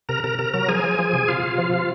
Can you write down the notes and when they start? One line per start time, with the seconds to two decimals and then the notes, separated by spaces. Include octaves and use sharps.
0.09 C3 A#4 A#5
0.24 C3 A#4 A#5
0.38 C3 A#4 A#5
0.54 F#3 A#4 A#5
0.68 F3 G#4 G#5
0.84 F3
0.99 F3
1.13 C3
1.28 C3 F4 F5
1.43 C3
1.58 F3
1.73 C3